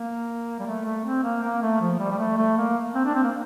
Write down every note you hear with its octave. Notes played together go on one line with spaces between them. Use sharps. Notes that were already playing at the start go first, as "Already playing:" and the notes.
Already playing: A#3
G3
A3
A3
C4
A#3
A#3
A3
F3
G3
G3
A3
A3
A#3
C4
D4
C4
A#3